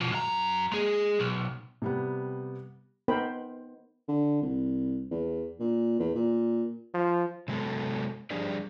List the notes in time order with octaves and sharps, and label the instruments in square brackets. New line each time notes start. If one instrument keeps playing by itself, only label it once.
[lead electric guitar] B2 F3
F#2 A#5
G#3 G#4
B1
[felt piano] C3 G3 B3
[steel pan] B3 D#4 A#4 C5 G5 B5
[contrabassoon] D3
C2
E2
A#2
E2
A#2
[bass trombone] F3
[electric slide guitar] C3 F#3 G#3 B3 A4
F3 G3 D4 G4 G#4 D5